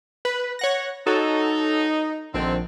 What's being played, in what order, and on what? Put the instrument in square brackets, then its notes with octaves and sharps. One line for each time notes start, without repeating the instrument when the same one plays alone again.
[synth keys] B4
C#5 F#5 A#6
[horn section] D#4 [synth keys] F#4 A4 C#5
[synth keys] A#1 [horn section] D3 D#3 C4